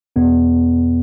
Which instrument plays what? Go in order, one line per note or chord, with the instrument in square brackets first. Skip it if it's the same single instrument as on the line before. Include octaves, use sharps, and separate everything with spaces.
[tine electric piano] E2 B2 B3